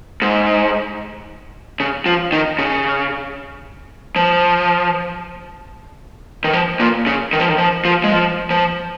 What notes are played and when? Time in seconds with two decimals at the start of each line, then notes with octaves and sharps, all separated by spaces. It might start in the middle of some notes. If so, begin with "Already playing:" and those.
0.22 G#2
1.80 C#3
2.06 F3
2.32 D#3
2.59 C#3
4.16 F3
6.44 D#3
6.53 F3
6.79 A#2
7.06 C#3
7.33 D#3
7.40 F3
7.48 D#3
7.58 F3
7.85 F3
8.04 G#3
8.12 F3
8.50 F3